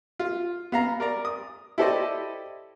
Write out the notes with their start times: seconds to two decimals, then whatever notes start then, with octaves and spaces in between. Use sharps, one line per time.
0.19 F4
0.72 B3 F5 A#5
1.00 A#4 D5 A#5
1.25 D#6
1.78 E4 G4 A4 C5 D5 D#5